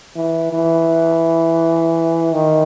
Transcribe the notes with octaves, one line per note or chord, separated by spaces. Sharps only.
E3
E3
D#3